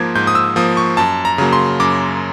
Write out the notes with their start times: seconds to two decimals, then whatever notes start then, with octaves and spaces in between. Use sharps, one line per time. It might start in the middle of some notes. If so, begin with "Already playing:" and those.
Already playing: G#2 F3 A#3 G#6
0.15 G#2 G6
0.27 D#6
0.35 E6
0.56 F3 A#3 D#6
0.77 C#6
0.97 F#2 A5
1.25 A#5
1.38 C#3 F#3 A#3
1.53 C6
1.80 F#2 D6